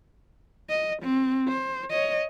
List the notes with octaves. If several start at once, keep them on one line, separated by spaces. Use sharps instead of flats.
D#5
C4
C5
C#5 D#5